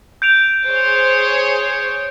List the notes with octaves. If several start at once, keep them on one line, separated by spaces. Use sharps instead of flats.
G6 D7 F7
G#4 C5 C#5